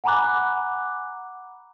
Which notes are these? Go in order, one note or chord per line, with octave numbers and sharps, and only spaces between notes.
F#5 G#5 A#5 B5 D6 F#6